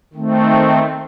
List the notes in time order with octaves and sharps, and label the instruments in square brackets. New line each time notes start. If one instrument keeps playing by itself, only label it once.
[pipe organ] D#3 A3 C4